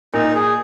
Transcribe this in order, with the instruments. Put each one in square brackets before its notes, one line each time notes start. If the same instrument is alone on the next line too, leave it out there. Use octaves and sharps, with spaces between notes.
[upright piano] A#2 [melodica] D#4
[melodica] G#4